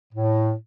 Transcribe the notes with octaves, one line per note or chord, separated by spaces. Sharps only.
A2